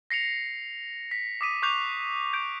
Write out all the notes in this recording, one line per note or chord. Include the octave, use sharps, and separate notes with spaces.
A#6 C7 C#7 F7
B6
D6 D#6 B6 D#7
C#6 D6 F#6 G6 C7 F7
G6 D7